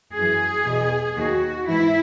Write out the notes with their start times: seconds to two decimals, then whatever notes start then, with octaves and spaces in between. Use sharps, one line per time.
0.15 F#2 E3 G#4
0.65 E2 B2
1.16 D#2 D#3 F#4
1.66 G#2 E3 E4